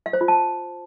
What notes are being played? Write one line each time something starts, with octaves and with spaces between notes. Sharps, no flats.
F5
C5
F4
A5